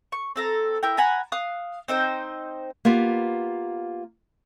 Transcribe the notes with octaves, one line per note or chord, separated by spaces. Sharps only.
C#6
C4 A4 A#5
E4 A#4 G5
F#5 G#5 A#5 B5
F5 D#6 F#6
C4 D#4 C5 G5
A#3 B3 F4 G4